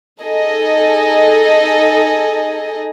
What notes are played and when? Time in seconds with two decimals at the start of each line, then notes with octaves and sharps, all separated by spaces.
0.21 D#4 G#4 A4 D#5